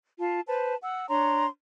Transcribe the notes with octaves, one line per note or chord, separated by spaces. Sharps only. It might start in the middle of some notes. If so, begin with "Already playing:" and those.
F4 A5
B4 C5 A5
F#5 E6
D4 C#5 A#5 C6